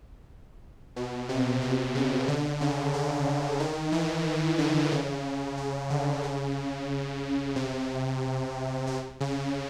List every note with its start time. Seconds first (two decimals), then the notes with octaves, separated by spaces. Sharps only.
0.96 B2
1.29 C3
1.62 C3
1.95 C#3
2.28 D3
2.61 C#3
2.94 D3
3.60 D#3
3.92 E3
4.58 D3
4.92 C#3
5.57 C#3
5.90 D3
6.24 C#3
7.56 C3
8.87 C3
9.21 C#3